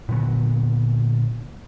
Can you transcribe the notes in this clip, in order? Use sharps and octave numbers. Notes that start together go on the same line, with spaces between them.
A#2 D3 F#3 B3